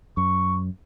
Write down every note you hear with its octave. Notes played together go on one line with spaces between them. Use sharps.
F#2 C#6